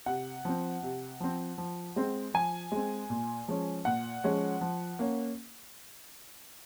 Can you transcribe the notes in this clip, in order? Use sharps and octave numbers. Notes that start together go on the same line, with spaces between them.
C3 F#5
F3 C4
C3
F3 C4
F3
G#3 C4
F3 G#5
G#3 C4
A#2
F3 G#3 C#4
A#2 F#5
F3 G#3 C#4
F3
A#3 C#4